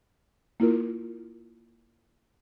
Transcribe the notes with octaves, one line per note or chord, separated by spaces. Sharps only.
A#3 E4 F4 A#4